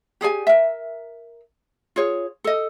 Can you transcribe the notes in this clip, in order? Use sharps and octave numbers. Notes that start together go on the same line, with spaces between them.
G4 G#4 D5 G#5
A#4 E5
F4 G#4 C#5
A4 D#5